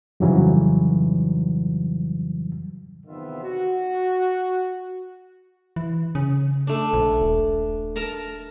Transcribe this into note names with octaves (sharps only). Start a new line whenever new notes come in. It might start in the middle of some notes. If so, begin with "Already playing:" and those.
F2 G#2 C#3 E3 F#3 G3
E2 C3 D#3 B3 F4 E5
F#4
E3
C#3
A3 D4
A#1
D#1
A#4 A5 A#5